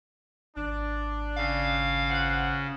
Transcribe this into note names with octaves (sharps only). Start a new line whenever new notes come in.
G#1 D4
C#3 F5
F4 C5 F#5